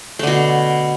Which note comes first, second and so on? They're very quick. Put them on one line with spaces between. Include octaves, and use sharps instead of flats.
A3 D3 B2